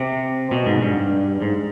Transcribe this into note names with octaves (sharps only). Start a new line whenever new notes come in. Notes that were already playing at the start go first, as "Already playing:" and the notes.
Already playing: C3
B2
G#2
G2
G#2